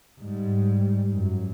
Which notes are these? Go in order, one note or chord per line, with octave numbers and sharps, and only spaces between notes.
G#2 G3
F#2